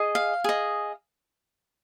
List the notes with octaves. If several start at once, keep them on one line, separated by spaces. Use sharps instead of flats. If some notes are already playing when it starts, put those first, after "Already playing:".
Already playing: G#4 D#5
F5
G#4 D#5